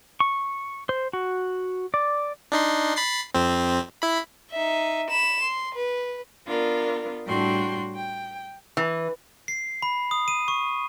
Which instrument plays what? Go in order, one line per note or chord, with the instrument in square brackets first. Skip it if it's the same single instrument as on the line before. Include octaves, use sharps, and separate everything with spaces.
[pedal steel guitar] C#6
C5
F#4
D5
[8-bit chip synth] D4 D#4 C6
B5 A6 C7
F2 C4
E4 B5
[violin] D#4 E5
B5 E7
C6
B4
[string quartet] B3 D4 F4 A#4
A2 G3 D4 F#4 G5 C6
G5
[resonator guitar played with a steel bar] E3
[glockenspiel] C7
B5
D#6
D#7
C#6